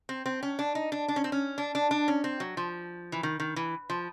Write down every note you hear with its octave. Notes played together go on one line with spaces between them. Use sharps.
C4
C4
C#4
D4
D#4
D4
D4
C#4
C4
C#4
D4
D4
D4
C#4
C4
F#3
F3
E3
D#3
D#3
E3
F3